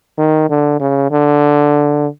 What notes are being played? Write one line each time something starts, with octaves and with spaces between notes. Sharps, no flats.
D#3
D3
C#3
D3